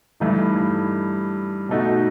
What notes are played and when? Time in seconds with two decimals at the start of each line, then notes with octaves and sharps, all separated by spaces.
0.20 G2 E3 A3 D#4
1.69 B2 A3 D#4 F#4